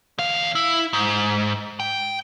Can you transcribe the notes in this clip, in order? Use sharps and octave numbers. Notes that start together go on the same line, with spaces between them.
E2 F5
E4
G#2
G5